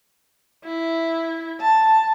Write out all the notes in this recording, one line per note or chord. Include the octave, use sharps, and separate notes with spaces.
E4
A5